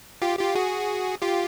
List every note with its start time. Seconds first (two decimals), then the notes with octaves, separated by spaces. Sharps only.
0.22 F4 G4
0.39 F4 G4
0.55 F#4 G#4
1.22 F4 G4